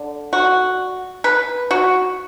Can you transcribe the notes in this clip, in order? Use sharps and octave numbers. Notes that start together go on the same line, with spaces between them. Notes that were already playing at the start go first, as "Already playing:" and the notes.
Already playing: D3
F#4
B4
F#4